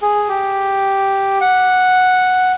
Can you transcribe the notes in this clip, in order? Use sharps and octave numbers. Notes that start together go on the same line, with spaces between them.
G#4
G4
F#5